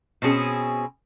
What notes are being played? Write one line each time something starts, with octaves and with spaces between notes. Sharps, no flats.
B2 C4 C#4 G#4